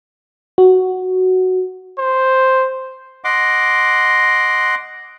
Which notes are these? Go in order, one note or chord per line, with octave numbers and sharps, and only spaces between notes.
F#4
C5
D#5 F#5 C6 D6